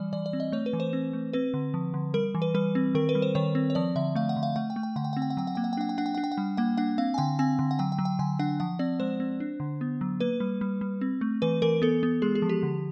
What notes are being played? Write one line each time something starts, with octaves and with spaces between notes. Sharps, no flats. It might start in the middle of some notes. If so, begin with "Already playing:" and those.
Already playing: E3 G3 D5
E3 D5
D5
C4
D#5
A3 C#5
B4
E3
C5
C4
A3
C4 B4
D3
F3
D3
G3 A#4
E3
B4
G3 B4
C4
D#3 A#4
B4
G3
C5
D#3 C#5
C4
C#5
F3 D5
D3 E5
A3 F5
F#5
D3
F5
A3 F#5
G5
A3
G5
D3 F#5
G5
F#5
C4
G5
F#5
F#3 G5
F#5
A#3 G5
F#5
G5
D4 F#5
G5
D4 F#5
G5
D4 F#5
G5
F#5
G3
A#3 F#5
D4 F#5
C4 F5
G#5
D3 G5
C4 G#5
D3
F#5
F#3 G5
G5
F#3
G5
D3 G#5
D4 F#5
F3 F#5
C4 D5
G#3 C5
C4
D4
D3
B3
F#3
A#3 B4
G3
G3
G3
C4
A3
E3 B4
E3 A#4
B3 A4
B3
G#3 G#4
G#4
F3
G4
D3